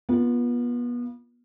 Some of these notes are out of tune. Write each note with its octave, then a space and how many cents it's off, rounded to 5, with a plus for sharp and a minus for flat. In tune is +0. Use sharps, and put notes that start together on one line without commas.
B3 -30 F4 +0